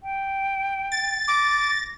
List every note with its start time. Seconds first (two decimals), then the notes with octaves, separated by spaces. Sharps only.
0.01 G5
0.92 A6
1.28 D6 A#6